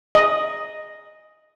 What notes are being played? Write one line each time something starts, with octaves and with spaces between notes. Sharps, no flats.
D#5